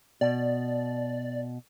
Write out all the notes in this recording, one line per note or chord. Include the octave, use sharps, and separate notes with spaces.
B2 D5